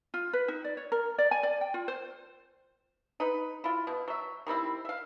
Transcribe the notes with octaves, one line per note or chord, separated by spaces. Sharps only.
F4
B4
D#4
D5
C#5
A#4
D5
G#5
D5
G5
F4
C5
D#4 B4
E4 F4
B2
F#3 E5
D#3 G3 C4 E4
E5 F5